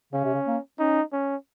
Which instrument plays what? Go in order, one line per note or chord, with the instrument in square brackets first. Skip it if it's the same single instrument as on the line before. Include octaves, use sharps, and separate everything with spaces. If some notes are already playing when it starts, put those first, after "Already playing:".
[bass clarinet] C#3 [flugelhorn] C#4
[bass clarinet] C3
C#3
A#3
[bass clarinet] C#4 [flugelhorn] D#4
[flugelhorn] C#4